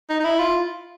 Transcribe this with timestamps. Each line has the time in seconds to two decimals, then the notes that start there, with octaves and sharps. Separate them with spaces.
0.10 D#4
0.20 D#4
0.24 E4
0.39 F4